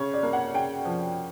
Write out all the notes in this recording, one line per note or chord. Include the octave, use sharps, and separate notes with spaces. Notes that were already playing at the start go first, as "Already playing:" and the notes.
Already playing: C#3 C#5
D5
A#3
F#5
C#3 G5
F3